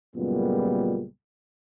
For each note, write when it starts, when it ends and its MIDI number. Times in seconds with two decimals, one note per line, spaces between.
0.16 1.06 37
0.16 1.06 42
0.16 1.06 46
0.16 1.06 55
0.16 1.06 56
0.16 1.06 59